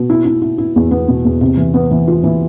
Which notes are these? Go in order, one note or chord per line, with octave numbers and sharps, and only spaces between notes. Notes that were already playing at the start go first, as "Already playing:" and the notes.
Already playing: B2
E4
E4
E4
E4
E2
B3
B2
E2
C3
E3
B3
E3
F4
E3